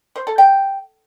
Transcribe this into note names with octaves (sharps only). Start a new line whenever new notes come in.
C5
A4
G5